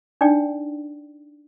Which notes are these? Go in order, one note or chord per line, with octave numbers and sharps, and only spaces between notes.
D4 D#4 D5 G5